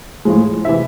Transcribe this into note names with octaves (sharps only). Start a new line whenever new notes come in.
A2 F3 G#3
C3 E3 E5